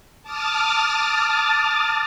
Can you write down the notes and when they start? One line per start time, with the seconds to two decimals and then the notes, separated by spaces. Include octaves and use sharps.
0.23 A5 D6 D#6 F6 A6